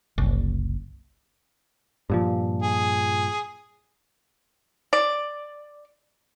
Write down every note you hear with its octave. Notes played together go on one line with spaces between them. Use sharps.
F#1 C2
G2 A#2 F3
G#4
D5